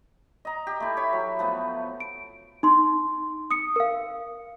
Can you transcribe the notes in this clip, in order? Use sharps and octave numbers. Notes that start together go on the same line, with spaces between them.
D#5 A#5
G4
A3 E4
C#5 B5
F#3
F3 A3 B3
D7
D#4 C6
D#6 C#7
A#4 F5